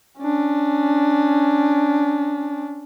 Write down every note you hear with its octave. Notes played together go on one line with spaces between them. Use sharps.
C#4 D4